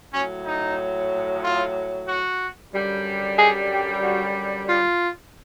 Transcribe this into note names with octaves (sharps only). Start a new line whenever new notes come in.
A2 F#3 C#4
D#4
F4
F#4
F#2 D3 G3
G#4
G4
F#4
F4